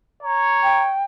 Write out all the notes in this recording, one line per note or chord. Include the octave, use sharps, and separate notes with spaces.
C#5 A#5
G5